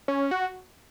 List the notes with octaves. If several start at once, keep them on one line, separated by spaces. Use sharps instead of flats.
C#4
F#4